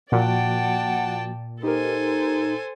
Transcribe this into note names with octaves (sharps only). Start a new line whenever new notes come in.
A#2 F3 A#3 F#4 D5 F#5 G5 A5
D#4 G4 A4 A#4 C5 G#5